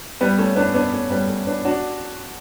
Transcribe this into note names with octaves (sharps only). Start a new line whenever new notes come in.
G3 B3
A3 C#4
B3 D4
B3 D4
A3 C#4
G3 B3
A3 C#4
B3 D4
D4 F#4